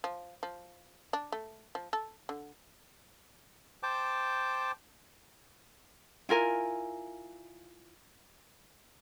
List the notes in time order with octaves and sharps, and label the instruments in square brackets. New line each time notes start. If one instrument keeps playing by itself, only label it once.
[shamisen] F3
F3
D4
A3
F3
A4
D3
[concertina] C5 G5 A5 D6
[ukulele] E4 F4 A#4 G#5